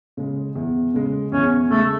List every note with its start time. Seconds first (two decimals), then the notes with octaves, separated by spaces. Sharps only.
0.17 C#3 G#3
0.56 E2
0.94 C#3 G#3
1.32 E2 C#4
1.70 C#3 G#3 A3